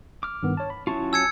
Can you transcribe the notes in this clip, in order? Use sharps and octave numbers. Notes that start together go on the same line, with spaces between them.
D6 F6
G2 D#3 B3
C#5 A5
B5
F#3 C#4 E4 F4 A5 C#6
G#5 A5 E6 G#6 C#7